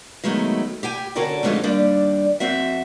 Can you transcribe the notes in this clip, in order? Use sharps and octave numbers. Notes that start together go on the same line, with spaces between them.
D#3 F#3 G#3 A3 B3
G4 G5 G#5
D3 C#4 F#4 A4 A#4 D5
F2 D3 D#3 G#3 A3 F4
D#2 G3 D4 D5
F2 C4 F#4 E5